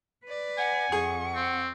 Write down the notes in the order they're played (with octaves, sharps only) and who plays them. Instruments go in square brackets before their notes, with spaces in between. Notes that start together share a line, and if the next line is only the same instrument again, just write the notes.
[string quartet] B4 D5
[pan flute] F#5 [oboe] G#5
[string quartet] F2 C#6 [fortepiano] G#4
[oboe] C4